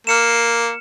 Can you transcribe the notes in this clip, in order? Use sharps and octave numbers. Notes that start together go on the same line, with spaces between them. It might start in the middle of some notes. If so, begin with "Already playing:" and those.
A#3 F6 C#7 E7